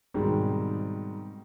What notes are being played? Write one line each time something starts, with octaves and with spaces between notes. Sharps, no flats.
G#2 B2 D#3 G3 C4